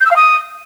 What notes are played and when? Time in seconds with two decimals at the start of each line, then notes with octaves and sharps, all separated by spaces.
0.01 G6
0.06 E6
0.11 F5
0.16 D#6